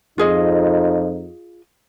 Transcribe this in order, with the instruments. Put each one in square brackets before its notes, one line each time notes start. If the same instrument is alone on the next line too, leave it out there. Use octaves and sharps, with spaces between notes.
[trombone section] F2 D#4 [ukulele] F4 G#4 D#5